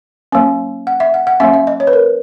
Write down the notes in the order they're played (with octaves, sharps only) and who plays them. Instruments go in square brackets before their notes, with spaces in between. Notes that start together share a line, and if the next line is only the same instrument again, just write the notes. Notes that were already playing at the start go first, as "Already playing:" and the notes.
[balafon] F#3 A#3 C#4
F#5
E5
F#5
F#5
F#3 A#3 C#4 E5
E5
D#5
C#5
B4
A#4